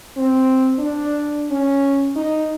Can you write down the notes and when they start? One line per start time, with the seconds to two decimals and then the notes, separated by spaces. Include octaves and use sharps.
0.17 C4
0.79 D4
1.51 C#4
2.16 D#4